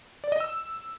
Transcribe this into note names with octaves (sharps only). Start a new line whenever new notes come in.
D5
D#5
E6